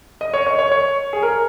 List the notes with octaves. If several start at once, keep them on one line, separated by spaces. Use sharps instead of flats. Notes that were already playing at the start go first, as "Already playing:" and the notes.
D#5
C#5
C#5
C#5
C#5
G#4
A#4